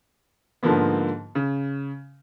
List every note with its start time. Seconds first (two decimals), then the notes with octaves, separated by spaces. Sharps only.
0.63 G#2 D3 F3 A#3 B3
1.35 C#3